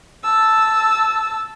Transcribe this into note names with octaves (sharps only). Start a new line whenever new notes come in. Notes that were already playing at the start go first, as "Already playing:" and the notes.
A5 E6